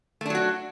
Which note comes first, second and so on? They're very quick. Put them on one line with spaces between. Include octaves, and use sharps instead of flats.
A3 D4 F#3 F#4